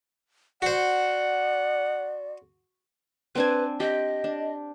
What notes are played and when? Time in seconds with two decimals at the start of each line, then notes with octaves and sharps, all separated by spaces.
0.62 F#4 C5 D5 F#5
3.35 C4 D4 B4 G#5
3.80 G4 D#5
4.24 D4